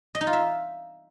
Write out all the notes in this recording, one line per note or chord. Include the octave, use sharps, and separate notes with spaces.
D#5
D#4
F4
E5